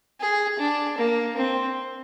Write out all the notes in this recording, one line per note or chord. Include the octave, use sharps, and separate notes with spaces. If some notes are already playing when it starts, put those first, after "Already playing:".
G#4
D4
A#3
C4